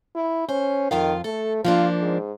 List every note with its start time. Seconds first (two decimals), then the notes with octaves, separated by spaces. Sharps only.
0.16 E4
0.49 C#4 C5
0.91 F2 D#3 F4 F5
1.24 A3 A4
1.65 F3 A#3 D4 F4
2.01 G#2